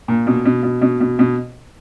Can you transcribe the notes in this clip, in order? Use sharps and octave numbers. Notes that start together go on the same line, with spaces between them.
A#2
B2
B2
B2
B2
B2
B2